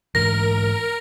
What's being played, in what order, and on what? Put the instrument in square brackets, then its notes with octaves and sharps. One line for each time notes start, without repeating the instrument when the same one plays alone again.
[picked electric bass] G#2 E3 [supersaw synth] A#4 [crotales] A#6